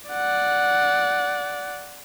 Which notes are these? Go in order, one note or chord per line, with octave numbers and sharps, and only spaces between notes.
D5 F#5